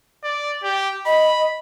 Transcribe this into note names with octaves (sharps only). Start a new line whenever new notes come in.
D5
G4
D#5 B5